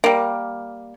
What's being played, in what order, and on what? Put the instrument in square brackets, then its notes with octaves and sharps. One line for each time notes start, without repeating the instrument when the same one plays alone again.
[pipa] G3 A#3